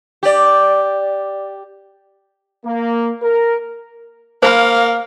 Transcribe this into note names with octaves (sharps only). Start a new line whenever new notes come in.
G4 D5
A#3
A#4
A#3 C5 F5 B5